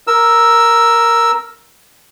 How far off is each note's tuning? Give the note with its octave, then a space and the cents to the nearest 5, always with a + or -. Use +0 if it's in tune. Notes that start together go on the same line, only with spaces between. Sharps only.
A#4 +0 E6 +0